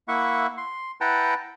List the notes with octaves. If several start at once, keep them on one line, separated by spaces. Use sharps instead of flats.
A#3 E4 E5 F#5 C#6
C6
E4 B4 F#5 G5 A5 A#5